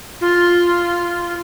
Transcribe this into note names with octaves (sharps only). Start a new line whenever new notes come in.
F4